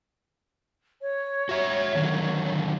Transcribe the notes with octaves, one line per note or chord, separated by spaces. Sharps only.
C#5
F#4 E5
D3 D#3 F#3